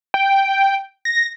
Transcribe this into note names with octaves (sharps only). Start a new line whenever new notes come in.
G5
A#6